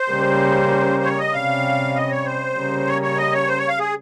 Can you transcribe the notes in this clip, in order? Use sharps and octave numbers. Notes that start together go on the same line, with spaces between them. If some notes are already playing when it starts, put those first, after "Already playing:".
Already playing: C5
C#3 G3 A#3 C#4
C#5
D#5
C3 G3 C#4 F5
D#5
C#5
C5
C#3 G3 A#3 C#4
C#5
C#5
D#5
C#5
C5
C#5
F5
G#4